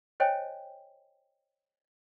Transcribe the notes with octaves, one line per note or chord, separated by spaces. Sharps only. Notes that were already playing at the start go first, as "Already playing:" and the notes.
C5 C#5 D#5 G5 G#5